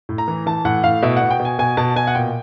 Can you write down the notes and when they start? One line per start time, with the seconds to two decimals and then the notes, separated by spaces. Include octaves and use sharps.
0.09 A2
0.18 A#5
0.28 E3
0.46 E3 A5
0.65 A2 F#5
0.84 A2 F5
1.03 B2 E5
1.17 B2 F#5
1.31 G5
1.40 B2
1.45 G#5
1.59 B2 G#5
1.77 B2 A5
1.96 B2 G#5
2.07 F#5
2.15 A#2 G5